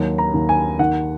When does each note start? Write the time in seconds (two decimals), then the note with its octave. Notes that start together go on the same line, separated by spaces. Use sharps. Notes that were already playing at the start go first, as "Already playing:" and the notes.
Already playing: D#2 F#3
0.18 A#5
0.34 D#2
0.49 G#5
0.79 D#3 F#5